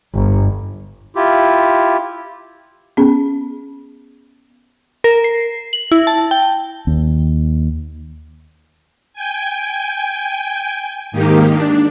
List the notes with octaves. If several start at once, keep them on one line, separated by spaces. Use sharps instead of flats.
G1
E4 F4 G4
B3 C#4 G#4
A#4
C7
F#7
E4
A5
G5
D#2
G5 G#5
G#2 D#3 A#3 D#4 G4
D4